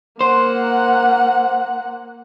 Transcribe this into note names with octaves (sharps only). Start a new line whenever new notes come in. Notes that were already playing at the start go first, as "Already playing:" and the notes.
A#3 C5 F#5